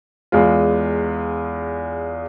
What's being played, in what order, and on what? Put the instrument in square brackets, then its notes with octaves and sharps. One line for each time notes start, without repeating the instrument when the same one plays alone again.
[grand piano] E2 G#3 F4